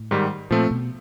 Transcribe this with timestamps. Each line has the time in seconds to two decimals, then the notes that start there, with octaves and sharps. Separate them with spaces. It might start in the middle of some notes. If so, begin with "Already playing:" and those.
Already playing: A2
0.11 G#2 D#3 G3
0.51 A#2 F3 A3 C4
0.71 B2